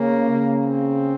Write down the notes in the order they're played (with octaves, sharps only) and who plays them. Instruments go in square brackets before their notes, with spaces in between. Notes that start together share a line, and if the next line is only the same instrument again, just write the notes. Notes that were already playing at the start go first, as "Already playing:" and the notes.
Already playing: [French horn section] C#3 [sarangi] A#3
[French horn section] C#3
[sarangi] C4